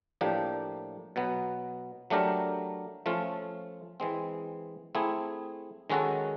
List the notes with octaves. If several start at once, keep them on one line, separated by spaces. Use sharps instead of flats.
A2 F3 A#3 D4 G4
B2 F#3 B3
F#3 A3 D4 G4 A#4
F3 A3 C#4 F4
E3 G#3 C4
A3 C4 E4 G#4
D#3 G#3 C#4 F#4 A4